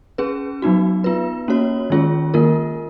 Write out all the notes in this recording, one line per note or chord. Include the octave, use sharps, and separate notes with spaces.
C#4 G#4 B4
F#3 B3 D#4 F#4
B3 F4 B4
A#3 C#4 F#4 C#5
D#3 G#3 C#4 F4 G#4
D#3 A#3 F4 A#4